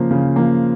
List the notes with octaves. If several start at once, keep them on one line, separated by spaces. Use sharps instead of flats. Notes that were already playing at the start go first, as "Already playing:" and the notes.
Already playing: C#3 F3 A#3 C5
C#3
F3 A#3